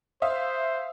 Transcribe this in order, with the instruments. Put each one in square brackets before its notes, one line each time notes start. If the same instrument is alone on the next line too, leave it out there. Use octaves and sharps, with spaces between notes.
[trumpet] C5 [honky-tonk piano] E5 F5 D#6